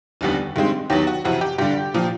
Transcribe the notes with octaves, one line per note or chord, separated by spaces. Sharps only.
F1 D#2 D3 G3 B3
G2 D#3 G#3 C4
D#2 D#3 F#3 B3 G4
F#4
F2 C3 E3 F#4
G4
G2 D3 G3 G4
A#2 F3